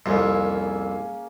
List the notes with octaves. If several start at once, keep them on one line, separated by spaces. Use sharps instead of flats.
C2 F2 A#3 C#4 G#4